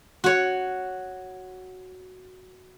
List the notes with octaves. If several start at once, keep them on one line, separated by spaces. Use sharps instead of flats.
F#4 C#5